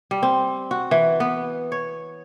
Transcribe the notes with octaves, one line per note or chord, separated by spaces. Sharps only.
G3
C4
F#4
E3
B3
C#5